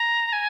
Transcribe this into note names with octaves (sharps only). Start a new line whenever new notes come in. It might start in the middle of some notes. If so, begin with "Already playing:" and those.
Already playing: A#5
G#5